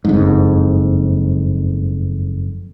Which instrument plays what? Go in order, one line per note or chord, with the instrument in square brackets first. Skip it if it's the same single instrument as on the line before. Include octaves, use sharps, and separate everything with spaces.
[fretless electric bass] F#1 F2 G#2